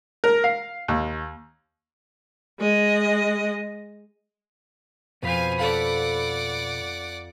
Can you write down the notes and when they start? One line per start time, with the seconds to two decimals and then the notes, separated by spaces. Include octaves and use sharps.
0.24 A#4
0.44 F5
0.88 D#2
2.59 G#3 D#5
5.23 F2 B2 B4 C5 F5 G#5
5.58 A4 D5 F5 F#5 B5